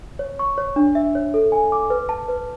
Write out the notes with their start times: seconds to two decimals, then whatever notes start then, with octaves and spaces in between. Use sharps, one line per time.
0.19 C#5
0.39 C#6
0.58 C#5
0.76 D4
0.95 E5
1.15 C#5
1.34 A4
1.52 G#5
1.72 D6
1.90 B4
2.09 A5
2.28 B4